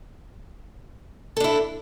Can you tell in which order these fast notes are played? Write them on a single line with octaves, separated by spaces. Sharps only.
A4 D4 E4